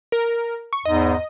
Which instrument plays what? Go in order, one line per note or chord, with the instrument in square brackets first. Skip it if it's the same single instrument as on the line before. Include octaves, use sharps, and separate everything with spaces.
[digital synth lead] A#4
C#6
[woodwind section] E2 G#2 [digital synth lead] D#5